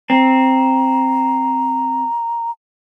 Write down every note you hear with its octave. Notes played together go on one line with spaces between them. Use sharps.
C4 A#5